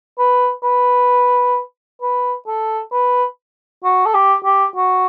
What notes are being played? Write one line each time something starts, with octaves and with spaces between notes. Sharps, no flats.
B4
B4
B4
A4
B4
F#4
A4
G4
G4
F#4